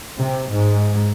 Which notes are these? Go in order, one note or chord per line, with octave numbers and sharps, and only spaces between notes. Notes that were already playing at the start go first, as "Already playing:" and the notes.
C3
G#2